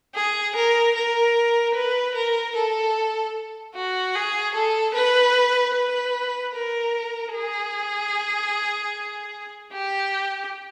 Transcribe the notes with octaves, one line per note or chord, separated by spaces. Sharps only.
G#4
A#4
A#4
B4
A#4
A4
F#4
G#4
A4
B4
B4
A#4
G#4
G4